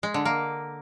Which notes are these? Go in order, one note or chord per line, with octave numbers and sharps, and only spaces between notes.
G#3
D3
A#3